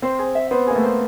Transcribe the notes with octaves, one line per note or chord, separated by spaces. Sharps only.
C4 C5
G#4
E5
B3 C5
A#3 G#4
A3
C5